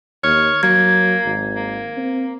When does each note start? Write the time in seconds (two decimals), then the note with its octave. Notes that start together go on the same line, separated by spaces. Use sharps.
0.24 D#2 C#5 F6
0.63 F#3 A#3 G#6
1.26 G#1
1.56 A#3
1.97 C4